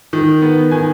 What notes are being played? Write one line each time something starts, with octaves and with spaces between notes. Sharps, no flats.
D#3
B3
D#3 G#5